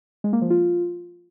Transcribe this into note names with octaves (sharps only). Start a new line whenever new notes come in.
G#3
A#3
F3
F4